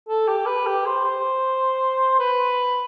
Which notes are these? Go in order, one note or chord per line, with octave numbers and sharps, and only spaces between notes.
A4
G4
B4
G4
C5
C5
B4